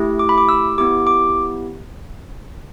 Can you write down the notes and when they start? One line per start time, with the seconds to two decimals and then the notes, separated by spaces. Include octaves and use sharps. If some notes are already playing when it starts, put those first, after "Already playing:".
Already playing: A3 E4 G4
0.19 D6
0.29 B5
0.38 D6
0.49 E6
0.78 B3 E4 G4 D6
1.07 D6